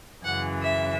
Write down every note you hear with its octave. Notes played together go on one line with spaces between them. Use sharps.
F#2 C#3 E3 F#5
E5